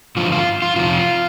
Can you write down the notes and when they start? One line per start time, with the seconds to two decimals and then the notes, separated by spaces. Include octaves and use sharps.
0.16 G2 D3 F3 F4
0.32 F4
0.62 F4
0.76 F2 C3 F3 F4